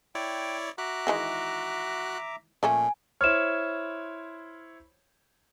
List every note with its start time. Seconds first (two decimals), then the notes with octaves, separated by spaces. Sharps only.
0.15 E4 C#5 D5 G5
0.78 F#4 E5 A#5 D6 F#6
1.07 D#3 E3 G#3
2.63 A#2 F3 A3 C#4 G#5
3.21 E4 C5 C#5 F6 E7